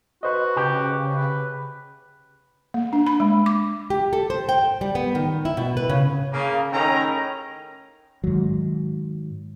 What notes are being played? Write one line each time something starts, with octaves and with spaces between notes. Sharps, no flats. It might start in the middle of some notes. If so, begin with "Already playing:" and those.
F#4 B4 C5 D#5
C#3 G4
B4
A#3
D4
B5
G#3
D6
G4
A4
C5
G5
G3
B3
D#3
E4
B2
B4
C#3
C#3 A#3
A2 D#3 C#4 G5 A#5
G#2 D#3 F#3